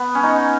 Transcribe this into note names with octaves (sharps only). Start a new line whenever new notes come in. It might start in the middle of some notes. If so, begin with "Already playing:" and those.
Already playing: B3
C#4
D#4